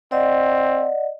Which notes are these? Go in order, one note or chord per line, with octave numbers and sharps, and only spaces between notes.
C4 D5 D#5 F#5